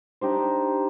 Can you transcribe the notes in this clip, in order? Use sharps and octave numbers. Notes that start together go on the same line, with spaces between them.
D4 D#4 G4 C5